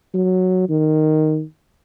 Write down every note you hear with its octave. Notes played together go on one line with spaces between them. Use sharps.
F#3
D#3